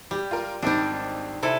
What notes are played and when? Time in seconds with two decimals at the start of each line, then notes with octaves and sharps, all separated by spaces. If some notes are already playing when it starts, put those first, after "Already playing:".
0.11 G3 G4
0.31 F4 A#4
0.62 G#1 G3 C4 D4 D#4
1.43 C3 E4 A4